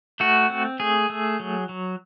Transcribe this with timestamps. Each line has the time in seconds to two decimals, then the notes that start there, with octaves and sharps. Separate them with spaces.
0.20 A3 F#4
0.50 C4
0.80 A3 G#4
1.09 A3
1.39 F#3
1.69 F#3